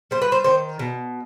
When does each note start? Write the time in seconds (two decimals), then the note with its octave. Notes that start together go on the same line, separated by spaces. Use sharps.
0.11 G3 C5
0.22 B4
0.32 C5
0.44 D#3 C5
0.79 B2